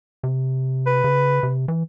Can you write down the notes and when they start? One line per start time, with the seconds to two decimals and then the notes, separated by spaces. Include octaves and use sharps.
0.23 C3
0.86 B4
1.04 C#3
1.43 C3
1.68 E3